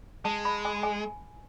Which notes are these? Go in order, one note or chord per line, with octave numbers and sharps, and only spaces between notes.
G#3 A5
B5
G#5
G#5